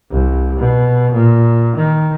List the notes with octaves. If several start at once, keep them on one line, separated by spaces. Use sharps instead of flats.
C2
B2
A#2
D#3